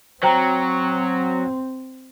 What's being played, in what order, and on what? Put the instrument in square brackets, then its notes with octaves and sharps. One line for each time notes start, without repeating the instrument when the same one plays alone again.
[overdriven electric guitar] F#3 [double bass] C4 [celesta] C5 G5 A#5